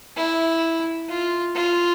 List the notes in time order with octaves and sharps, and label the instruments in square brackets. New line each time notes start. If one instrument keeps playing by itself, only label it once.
[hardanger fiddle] E4
F4
F4